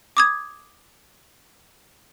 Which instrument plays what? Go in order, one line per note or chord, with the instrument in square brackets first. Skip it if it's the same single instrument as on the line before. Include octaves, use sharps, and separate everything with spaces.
[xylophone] D6 D#6 G#6